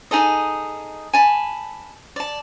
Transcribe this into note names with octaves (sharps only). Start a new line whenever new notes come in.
D#4 G#4 A4 D#5
G#5 A5 B5
D5 A5